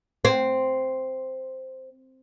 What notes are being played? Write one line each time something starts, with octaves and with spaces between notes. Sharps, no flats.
C4